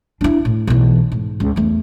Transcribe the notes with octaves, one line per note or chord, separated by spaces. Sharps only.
D4 E4
A2
B1 E3
G#2
C#2
E2 A3